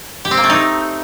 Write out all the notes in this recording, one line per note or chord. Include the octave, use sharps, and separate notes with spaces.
G4
C4
A#3
A3
D#4